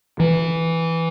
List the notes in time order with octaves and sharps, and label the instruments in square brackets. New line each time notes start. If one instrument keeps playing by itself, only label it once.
[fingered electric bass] E3